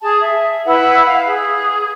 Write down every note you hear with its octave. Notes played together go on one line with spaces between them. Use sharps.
G#4 A5
E5
E4 B4 F#5
F5
G#4